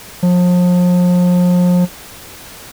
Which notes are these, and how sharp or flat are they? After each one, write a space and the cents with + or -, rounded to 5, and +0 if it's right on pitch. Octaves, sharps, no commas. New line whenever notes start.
F3 +35